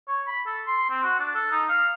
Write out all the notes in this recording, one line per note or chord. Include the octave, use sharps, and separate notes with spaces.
C#5
B5
A4
C6
C4
F#4
D4
A4
D#4
F5